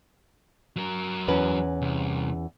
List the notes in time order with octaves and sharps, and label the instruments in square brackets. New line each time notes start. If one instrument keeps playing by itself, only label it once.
[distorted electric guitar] F#3 A#4
[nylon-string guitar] E2 C#4 B4
[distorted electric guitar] C2